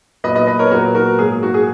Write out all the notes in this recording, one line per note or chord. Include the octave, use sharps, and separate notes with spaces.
A#2 F#3 B3 B4 D#5
B4 D#5
B4 D#5
A#4 C#5
A#2 F#3 B3 F#4 A#4
F#4 A#4
G#2 F#3 A#3 G#4
F#4
G#4